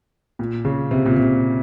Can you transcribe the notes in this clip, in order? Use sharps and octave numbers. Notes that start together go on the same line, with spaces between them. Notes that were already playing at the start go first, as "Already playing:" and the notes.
A#2
C#3
C3
A#2
C3